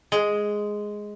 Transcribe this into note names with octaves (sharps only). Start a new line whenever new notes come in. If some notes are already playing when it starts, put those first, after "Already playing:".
G#3